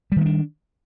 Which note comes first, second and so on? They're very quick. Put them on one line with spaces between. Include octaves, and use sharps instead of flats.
G3 D#3 A#3 D4